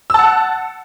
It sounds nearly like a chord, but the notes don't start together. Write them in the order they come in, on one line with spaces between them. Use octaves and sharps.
E6 A5 F#5